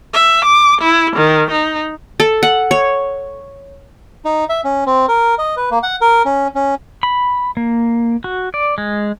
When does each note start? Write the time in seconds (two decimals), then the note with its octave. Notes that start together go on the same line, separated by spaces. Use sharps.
0.14 E5
0.45 D6
0.81 E4
1.16 D#3
1.51 D#4
2.20 A4
2.43 F#5
2.71 C#5
4.25 D#4
4.49 E5
4.64 C#4
4.86 C4
5.08 A#4
5.38 D#5
5.57 B4
5.71 A#3
5.83 F#5
6.01 A#4
6.25 C#4
6.55 C#4
7.03 B5
7.57 A#3
8.24 F#4
8.54 D5
8.78 G#3